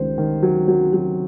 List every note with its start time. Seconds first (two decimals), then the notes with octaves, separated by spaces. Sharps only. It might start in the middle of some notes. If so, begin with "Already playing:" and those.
Already playing: C#2 C3 D#3 C5
0.18 D#3
0.43 F#3
0.68 F#3
0.93 F#3